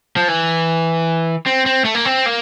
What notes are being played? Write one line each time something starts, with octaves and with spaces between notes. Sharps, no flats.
F3
E3
C4
C4
A3
A#3
C4
A#3